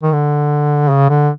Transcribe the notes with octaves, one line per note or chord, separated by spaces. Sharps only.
D#3
D3
C#3
D3